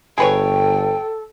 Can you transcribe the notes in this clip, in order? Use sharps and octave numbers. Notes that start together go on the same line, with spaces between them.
G1 G#4 A4 B4 C#5 G5